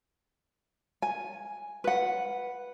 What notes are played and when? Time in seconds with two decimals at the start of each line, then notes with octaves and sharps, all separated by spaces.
1.02 G#5
1.84 B4 F#5